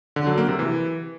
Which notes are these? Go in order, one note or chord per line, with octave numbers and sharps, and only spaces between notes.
D3
F#3
A#3
C3
E3